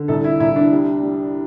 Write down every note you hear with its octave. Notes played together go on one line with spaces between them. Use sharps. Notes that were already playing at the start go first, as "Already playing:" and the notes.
Already playing: D3
C2 A4
E4
C2 E4
D4
G3
G3